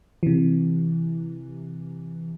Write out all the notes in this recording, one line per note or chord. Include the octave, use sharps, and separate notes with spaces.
C3 E3